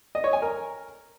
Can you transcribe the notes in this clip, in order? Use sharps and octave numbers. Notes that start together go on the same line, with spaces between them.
D#5
C#5
G#5
A#4